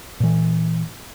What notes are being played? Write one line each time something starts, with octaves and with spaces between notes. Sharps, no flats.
A#2 E3